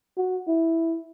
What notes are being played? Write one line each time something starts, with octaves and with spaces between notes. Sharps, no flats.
F#4
E4